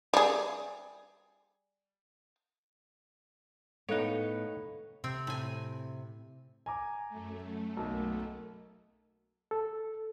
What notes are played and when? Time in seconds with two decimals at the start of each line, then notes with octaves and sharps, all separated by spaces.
0.14 G3 G#4
3.89 A2 B3 D#4 A4 C#5 F5 F#6
5.04 C3 C4
5.27 A2 G#5
6.66 G#5 A#5 D6
7.09 F#2 A3
7.77 B1 A#3 D#5
9.51 A4